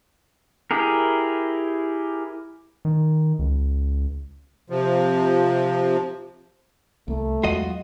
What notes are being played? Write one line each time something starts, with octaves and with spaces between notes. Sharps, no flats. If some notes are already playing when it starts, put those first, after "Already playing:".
E4 G4 G#4 A#4
D#3
C#2
C3 F3
C2 A3 A#3
E2 F#3 G#3 F4 F#4 D#5